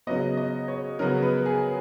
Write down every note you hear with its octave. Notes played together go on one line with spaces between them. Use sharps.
C#3 F#3 B3 D#5
D#5
C#5
C#3 F#3 B3 A#4
B4
G#4